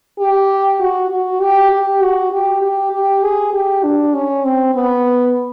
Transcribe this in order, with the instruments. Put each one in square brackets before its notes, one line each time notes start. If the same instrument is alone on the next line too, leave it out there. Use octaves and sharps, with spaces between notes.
[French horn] G4
F#4
F#4
G4
G4
F#4
G4
G4
G4
G#4
G4
D4
C#4
C4
B3